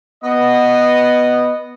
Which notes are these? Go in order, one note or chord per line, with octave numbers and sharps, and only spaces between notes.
B3 D#5